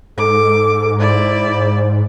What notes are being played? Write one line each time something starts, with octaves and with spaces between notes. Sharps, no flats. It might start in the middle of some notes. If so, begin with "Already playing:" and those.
G#2 A4 D6
E4 C5 D5